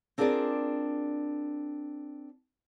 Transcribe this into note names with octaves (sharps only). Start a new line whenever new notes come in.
C4 D4 F4 G#4 A#4 D5